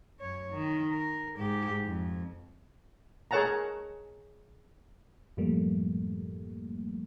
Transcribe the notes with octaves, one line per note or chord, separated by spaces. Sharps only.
F#2 C#5
D#3
A#4
G#2 G4
F2
G#4 A#4 C#5 F#5 A5 A#5
F#2 A2 F3 G3 A3 A#3